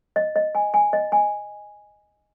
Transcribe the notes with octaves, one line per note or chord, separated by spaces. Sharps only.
D#5
D#5
G#5
G#5
D#5
G#5